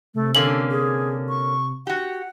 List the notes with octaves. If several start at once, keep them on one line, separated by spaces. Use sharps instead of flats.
C3 A3
D3 A#3 C#4 A4 F#7
G#4
C#6
F#4 G4 F#5